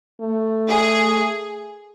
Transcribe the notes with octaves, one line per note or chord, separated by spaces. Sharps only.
A3
G#4